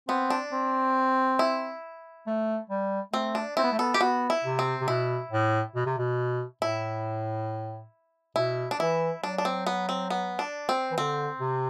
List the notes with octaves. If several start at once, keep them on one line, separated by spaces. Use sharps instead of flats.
B3 C4
D4
C4
E4
A3
G3
A3 C4
D4
C4 E4
B3
A3
B3 A4
G4
B3 F#4
E4
C3
C4
C3
B2 E4
A2
B2
C3
B2
A2 E4
B2 E4
D4
E3 E4
F#3 D4
D4
C4
B3
C4
B3
D4
C4
E3
D3 C4
C3